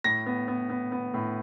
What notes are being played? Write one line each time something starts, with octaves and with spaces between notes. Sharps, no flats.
A2 A#6
B3
B3
B3
B3
A2